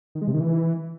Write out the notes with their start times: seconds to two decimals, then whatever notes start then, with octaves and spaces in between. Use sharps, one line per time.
0.15 D#3
0.21 G#3
0.28 C3
0.34 D#3
0.40 E3